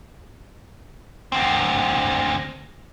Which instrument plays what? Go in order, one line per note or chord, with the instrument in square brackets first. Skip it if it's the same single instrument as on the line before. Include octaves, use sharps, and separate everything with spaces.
[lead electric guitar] D2 C4